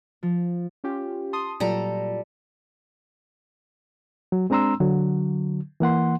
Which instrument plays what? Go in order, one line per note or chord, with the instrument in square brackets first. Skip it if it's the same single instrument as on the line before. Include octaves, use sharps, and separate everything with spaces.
[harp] F3
[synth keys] C#4 F4 G4
A5 C6 D#6
[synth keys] A#2 F#3 F4 [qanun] G3 A4 A#5
[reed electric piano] F#3
G#3 C4 D4 A#5 C6 E6
D3 F#3
E3 A#3 F#5 C6